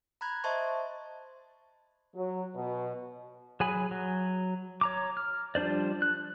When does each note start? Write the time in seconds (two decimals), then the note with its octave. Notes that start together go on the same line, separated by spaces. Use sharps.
0.21 A#5 B5 F#6 G#6
0.44 C5 D#5 E5 A5 C6 C#6
2.15 F#3
2.55 B2
3.60 F#3 G#4 G#5 B5
3.91 F#3
4.81 C#5 A#5 D6
5.17 F6
5.55 F3 G3 D4 C5 D5
6.02 F#6